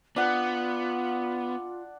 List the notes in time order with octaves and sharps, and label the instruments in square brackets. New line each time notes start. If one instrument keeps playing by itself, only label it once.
[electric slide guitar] B3 [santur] D4 F#5 [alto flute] F4